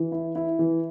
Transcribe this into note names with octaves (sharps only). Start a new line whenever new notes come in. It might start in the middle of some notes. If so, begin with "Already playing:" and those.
Already playing: E3
E4
E4
E3